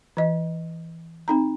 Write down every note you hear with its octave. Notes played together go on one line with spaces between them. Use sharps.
E3 D#5
C4 D#4 A#5